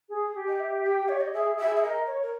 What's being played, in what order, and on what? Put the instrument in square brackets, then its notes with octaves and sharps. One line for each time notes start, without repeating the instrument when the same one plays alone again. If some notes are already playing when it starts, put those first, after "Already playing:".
[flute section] G#4
G4
[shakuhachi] D#5
E5
G5
C#5
D#5
[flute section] G#4 [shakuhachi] E5
[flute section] G#4
[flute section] G4 [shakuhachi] E5
[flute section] G#4
[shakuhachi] E5
[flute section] A#4 [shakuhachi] D#5
[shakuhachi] C#5
A#4